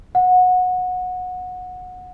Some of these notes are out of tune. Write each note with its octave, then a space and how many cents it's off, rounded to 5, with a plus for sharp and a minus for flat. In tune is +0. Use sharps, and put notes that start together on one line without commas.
F#5 -20